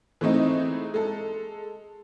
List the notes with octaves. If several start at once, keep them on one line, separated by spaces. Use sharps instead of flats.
E3 G#3 A3 C4 D#4 D#5
G#3 A4